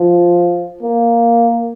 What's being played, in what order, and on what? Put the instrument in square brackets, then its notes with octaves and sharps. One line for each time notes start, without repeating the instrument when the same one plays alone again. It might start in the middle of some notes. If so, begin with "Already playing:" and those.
Already playing: [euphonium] F3
A#3